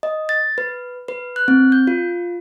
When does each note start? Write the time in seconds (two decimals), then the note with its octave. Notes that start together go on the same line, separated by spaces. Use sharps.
0.03 D#5
0.29 A6
0.58 B4
1.08 B4
1.36 F#6
1.48 C4
1.72 G6
1.87 F4